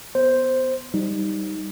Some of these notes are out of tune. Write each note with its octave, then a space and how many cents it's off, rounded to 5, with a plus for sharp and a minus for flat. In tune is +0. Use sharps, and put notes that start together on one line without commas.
B3 +10 C5 +0
G3 +0 D#4 +0